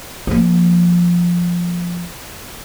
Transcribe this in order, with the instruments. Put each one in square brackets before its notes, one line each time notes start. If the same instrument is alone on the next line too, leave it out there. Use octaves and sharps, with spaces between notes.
[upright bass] F3 A#3